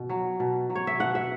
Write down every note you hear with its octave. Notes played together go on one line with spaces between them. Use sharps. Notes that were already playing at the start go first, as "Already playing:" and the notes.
Already playing: B2
F#3
B2
F#3
C#5
E5
B2 F#5
E5